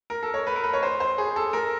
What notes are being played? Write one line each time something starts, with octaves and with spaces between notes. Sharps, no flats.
A#4
A4
C#5
B4
A#4
B4
C#5
C5
C5
G#4
A4
A#4